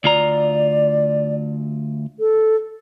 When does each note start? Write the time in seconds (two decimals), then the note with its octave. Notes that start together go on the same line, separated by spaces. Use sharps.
0.04 D2 F4 D5 A#5
2.20 A4